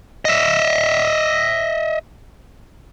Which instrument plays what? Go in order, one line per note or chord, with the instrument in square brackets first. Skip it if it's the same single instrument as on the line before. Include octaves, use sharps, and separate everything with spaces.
[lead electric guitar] D#5 E5